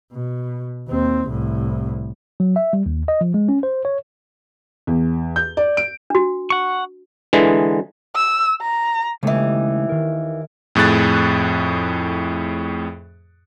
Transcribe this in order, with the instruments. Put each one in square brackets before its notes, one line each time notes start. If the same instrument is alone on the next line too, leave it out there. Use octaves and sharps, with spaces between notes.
[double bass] B2
D#2 C4
C2 A2
[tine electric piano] F#3
E5
G3
D#2
D#5
F3
G#3
C#4
C5
C#5
[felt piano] E2
G6
D5
D7
[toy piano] D4 F#4
[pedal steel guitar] F#5 C#6
[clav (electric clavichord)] D3 E3 G#3
[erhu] E6
A#5
[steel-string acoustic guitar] D#2 E3 [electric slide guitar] C#3 G#3 A3
[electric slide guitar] D#3 A#4
[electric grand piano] F2 A2 G#4 F#6 A6